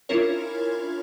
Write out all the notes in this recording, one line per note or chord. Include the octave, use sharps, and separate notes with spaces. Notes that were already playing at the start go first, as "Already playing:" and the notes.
C#4 D4 E4 F4 A#4 C#5